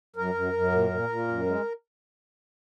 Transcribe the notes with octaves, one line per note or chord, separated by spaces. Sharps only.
F#2 A#4
F#2
F#2
A#2
A#2
A#2
F#2
G#3